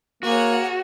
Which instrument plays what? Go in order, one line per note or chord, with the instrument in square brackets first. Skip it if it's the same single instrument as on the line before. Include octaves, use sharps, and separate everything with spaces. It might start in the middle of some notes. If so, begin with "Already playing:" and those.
[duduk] A#3 [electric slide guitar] F#4 [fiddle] G#4 C#5